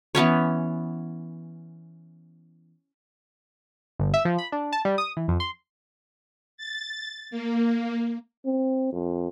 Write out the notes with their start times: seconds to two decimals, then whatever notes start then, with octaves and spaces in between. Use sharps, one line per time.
0.15 E3 B3 C#4 C#5
3.99 G1
4.14 E5
4.25 F3
4.38 B5
4.52 D4
4.73 A5
4.85 G3
4.98 D#6
5.17 E3
5.28 F2
5.40 C6
6.57 A6
7.31 A#3
8.45 C4
8.92 F2